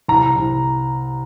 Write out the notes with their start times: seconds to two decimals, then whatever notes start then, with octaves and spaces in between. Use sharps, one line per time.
0.08 C2 A#5
0.36 C2